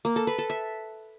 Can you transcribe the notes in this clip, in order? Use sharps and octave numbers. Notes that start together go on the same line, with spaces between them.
A#3
A4
B4
A4
E5